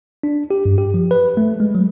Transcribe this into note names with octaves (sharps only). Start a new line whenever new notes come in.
D4
G4
G2
G4
F3
B4
A3
G#3
F#3